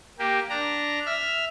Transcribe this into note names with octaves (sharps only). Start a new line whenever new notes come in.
A#3 G4
D4 A#5
E5 F6